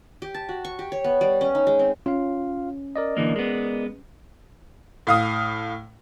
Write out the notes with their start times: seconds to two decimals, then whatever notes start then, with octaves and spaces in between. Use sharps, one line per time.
0.22 G4
0.34 A5
0.49 F#4
0.65 C#6
0.79 G4
0.92 C#5
1.04 B3
1.21 G3
1.41 C#4
1.55 D#4
1.67 G#3
1.79 C4
2.06 C#4 F4 F5
2.96 A#4 D5 D#5
3.17 D3 E3 A#3
3.36 G#3 B3
5.07 A2 F5 D#6